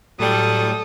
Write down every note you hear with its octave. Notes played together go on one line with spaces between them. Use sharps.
A2 F#3 G3 A4 D#6